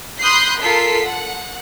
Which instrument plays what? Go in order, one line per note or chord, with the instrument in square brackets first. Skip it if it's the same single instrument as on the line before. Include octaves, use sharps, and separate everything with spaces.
[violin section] B5 C6 D#6 F#6 G6 C7
F4 A4 A#4 B6 C7
F#5